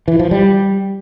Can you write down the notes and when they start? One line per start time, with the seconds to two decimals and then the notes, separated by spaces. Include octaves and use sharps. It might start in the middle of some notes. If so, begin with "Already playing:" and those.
0.08 E3
0.19 F3
0.31 G3